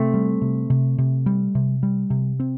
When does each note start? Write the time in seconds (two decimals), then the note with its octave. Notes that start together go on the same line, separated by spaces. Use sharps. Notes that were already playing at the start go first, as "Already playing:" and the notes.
Already playing: C3 A3 C4
0.14 G3
0.42 C3
0.70 C3
0.98 C3
1.26 G3
1.55 C3
1.83 G3
2.10 C3
2.40 C4